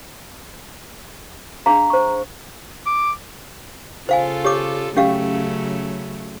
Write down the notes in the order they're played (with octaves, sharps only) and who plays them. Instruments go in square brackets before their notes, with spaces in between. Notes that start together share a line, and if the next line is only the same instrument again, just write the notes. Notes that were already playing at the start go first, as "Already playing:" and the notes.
[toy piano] D4 G#4 F5 [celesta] A#5
[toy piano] C5 C#6
[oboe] D6
[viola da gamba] C#3 F4 A4 [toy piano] C5 F5 G#5
[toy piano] G4 C#5 D6
[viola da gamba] C#3 F#3 A3 [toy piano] C#4 G4 F5